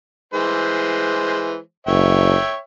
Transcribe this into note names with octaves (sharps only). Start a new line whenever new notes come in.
E3 G#3 C5
F#1 C#5 E5 G5